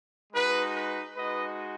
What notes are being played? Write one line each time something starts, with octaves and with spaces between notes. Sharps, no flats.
G#3 D#4 F#4 B4
B4
G#3 D#4 F#4 B4 D#5